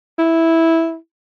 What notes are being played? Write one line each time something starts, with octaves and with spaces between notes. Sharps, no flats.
E4